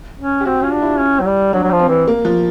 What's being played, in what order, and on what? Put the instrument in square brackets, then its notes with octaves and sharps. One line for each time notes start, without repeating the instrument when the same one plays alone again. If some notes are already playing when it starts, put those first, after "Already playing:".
[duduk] C#4
[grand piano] G4
[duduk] C4 [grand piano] F#4
[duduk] C#4 [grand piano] F4
[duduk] D4
[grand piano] E4
[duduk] C#4
F#3
G3
[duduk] F#3 [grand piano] D4
[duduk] F#3
F3
[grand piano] C4
[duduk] E3
[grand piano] A#3
F3